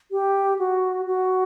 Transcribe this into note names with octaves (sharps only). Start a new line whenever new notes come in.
G4
F#4
F#4